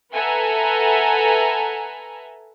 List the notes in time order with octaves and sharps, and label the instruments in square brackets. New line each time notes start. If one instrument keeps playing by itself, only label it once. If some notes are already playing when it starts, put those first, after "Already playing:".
[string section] A4 B4 E5 F#5 G#5 A#5